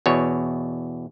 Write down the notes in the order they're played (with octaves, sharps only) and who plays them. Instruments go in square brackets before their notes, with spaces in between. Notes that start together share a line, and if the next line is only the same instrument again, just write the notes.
[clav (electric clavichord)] E2 B2 C#5